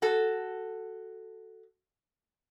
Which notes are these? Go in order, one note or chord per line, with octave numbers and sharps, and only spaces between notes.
F#4 A4